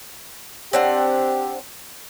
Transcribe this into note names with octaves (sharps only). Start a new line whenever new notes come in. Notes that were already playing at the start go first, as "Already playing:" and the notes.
C4 D4 G4 F#5